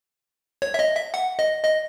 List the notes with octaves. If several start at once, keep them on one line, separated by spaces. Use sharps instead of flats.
C#5
E5
D#5
E5
F#5
D#5
D#5